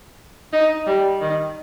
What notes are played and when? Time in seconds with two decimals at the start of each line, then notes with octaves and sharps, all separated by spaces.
0.53 D#4
0.87 G3
1.21 D#3